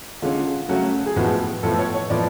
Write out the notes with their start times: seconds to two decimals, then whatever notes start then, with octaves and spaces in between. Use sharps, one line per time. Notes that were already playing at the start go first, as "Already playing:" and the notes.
0.22 D3 G#3 C#4 F4
0.68 C#3 F#3 A3 C#4 F#4
1.06 G#4
1.16 A2 F3 G#3 B3 F#4
1.63 A2 F3 B3 A4
1.78 C#5
1.94 C#5
2.10 A2 F3 B3 D5